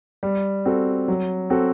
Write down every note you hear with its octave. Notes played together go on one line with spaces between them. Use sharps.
G3
C4 F#4 A4
F#3
C4 F#4 A4